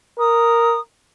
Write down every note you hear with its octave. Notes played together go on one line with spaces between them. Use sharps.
A#4 D#6